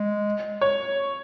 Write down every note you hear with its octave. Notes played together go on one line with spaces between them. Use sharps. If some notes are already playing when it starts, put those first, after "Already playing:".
Already playing: G#3
C#5